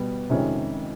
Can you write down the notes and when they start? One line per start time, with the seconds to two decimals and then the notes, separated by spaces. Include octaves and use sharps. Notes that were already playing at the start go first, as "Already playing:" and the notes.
Already playing: B2 G3 B3
0.30 F2 C3 D#3 G#3 C#4